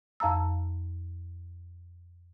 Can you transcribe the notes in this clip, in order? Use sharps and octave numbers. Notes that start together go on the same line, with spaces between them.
F2 F5 A5 A#5 E6